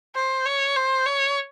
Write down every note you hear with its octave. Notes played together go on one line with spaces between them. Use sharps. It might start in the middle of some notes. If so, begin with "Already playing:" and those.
C5
C#5
C5
C#5